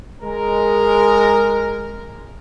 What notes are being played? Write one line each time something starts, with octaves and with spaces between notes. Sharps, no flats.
G#3 A#4